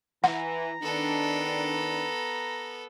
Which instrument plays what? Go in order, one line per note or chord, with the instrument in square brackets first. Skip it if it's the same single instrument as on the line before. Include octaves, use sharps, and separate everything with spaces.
[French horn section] E3 [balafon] F#5 [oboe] A#5
[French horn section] D#3 D4 [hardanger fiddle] B3 A4